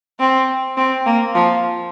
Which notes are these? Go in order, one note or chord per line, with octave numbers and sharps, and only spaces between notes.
C4
C4
A#3
F3